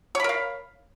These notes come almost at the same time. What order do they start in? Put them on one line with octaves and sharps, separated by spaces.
C#5 B5 A#4 F5